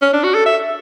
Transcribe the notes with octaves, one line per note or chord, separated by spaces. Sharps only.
C#4
D4
F#4
A4
E5